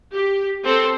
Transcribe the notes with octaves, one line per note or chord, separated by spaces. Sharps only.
G4
C4 A4 C5